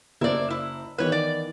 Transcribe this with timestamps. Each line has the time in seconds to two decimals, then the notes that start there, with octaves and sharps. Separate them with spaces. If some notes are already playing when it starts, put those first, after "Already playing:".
0.21 F#1 E4 C5 D5
0.50 E4
0.98 D#3 E3 B3 B4 C#5
1.12 D5